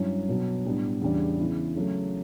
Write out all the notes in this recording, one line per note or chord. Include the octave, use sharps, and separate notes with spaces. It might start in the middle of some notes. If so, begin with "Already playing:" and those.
Already playing: G2 F#3 C#4 E4
B2 F#3 B3
A2 G3 B3 D4
E2 C#3 G3 D4
C#3 E3 B3 E4
C#3 F#3 A3